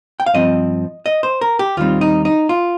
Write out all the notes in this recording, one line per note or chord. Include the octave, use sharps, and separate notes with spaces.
G5
F5
G2 F3 C4 D#5
D#5
C5
A#4
G4
D#2 D#3 G3 C4 F4
D#4
D#4
F4